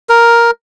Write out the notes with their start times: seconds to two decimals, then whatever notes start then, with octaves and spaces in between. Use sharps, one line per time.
0.09 A#4